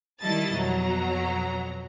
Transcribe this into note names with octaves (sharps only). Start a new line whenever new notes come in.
D#3 G3 E4 D#5 A5 A6
F2 B2 F#3 A#5